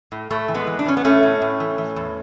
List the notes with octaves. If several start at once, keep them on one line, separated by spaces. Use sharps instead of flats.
A2
A2 A3
E3
G#3 B3
E3
D4
E3 C#4
B3
A2 A3 C#4
A2
A2
E3
E3
E2